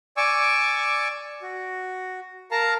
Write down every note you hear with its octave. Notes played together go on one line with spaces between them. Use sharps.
D5 G#5 C#6 D6 E6
F#4
A#4 F5 A5 A#5